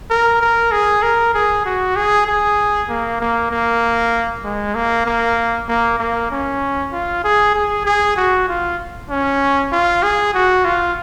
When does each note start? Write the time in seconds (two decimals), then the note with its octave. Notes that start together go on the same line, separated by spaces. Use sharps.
0.10 A#4
0.41 A#4
0.72 G#4
1.02 A#4
1.34 G#4
1.65 F#4
1.96 G#4
2.27 G#4
2.89 A#3
3.20 A#3
3.50 A#3
4.44 G#3
4.75 A#3
5.06 A#3
5.68 A#3
5.99 A#3
6.31 C#4
6.92 F4
7.24 G#4
7.55 G#4
7.85 G#4
8.16 F#4
8.48 F4
9.09 C#4
9.72 F4
10.03 G#4
10.34 F#4
10.65 F4